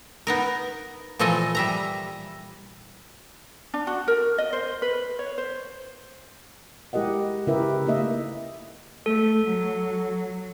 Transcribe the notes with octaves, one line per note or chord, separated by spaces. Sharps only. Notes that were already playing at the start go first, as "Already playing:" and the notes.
B3 D#4 A#4
A#2 E3 F3 A4 D#5 G#5
G3 E5 A#5
D4
F#4
A#4
D#5
C5
B4
C#5
C5
G#3 E4 G4 A#4 D#5 F#5
C#3 E4 G4 A#4 B4 E5
A3 A#3 D#4 D#5 E5
A3 A4
F#3